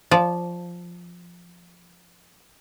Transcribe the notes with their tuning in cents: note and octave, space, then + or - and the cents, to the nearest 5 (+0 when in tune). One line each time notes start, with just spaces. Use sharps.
F3 +0 D5 -20